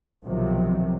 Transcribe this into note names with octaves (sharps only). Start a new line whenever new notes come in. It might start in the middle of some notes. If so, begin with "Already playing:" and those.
B1 C3 D#3 F3 F#3